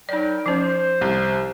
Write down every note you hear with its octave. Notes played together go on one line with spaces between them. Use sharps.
F#3 D#4 A#4 D5 G5
F3 C#4 C5
C2